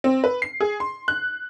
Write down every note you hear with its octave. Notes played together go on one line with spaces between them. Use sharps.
C4
B4
C7
G#4
C6
F#6